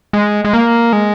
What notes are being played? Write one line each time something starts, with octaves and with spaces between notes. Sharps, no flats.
G#3
G#3
A#3
G#3